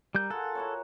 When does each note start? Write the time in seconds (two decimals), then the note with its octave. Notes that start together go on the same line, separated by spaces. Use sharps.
0.15 G3 A#4 G6
0.30 F4 G#4 A4 F#5
0.55 E4 F#4 C#5